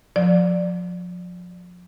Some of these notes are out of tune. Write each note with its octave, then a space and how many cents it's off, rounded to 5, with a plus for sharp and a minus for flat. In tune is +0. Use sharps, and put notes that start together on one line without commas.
F3 +30 D5 +5